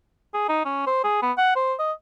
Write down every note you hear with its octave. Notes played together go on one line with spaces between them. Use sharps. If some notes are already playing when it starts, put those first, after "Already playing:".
G#4
D#4
C#4
C5
G#4
B3
F#5
C5
D#5